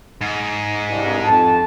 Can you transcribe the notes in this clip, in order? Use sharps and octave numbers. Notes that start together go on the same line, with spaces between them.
G#2
C2 G2
F2 A5